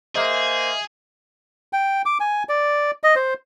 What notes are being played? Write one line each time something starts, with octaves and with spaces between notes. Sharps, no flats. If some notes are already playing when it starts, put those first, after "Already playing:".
A#3 G#4 C5 D#5 E5
G5
D6
G#5
D5
D#5
C5